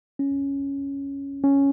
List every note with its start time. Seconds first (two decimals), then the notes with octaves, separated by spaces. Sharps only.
0.19 C#4
1.44 C#4